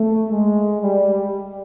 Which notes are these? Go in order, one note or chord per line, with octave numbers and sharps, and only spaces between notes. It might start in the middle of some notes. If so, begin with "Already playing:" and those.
Already playing: A3
G#3
G3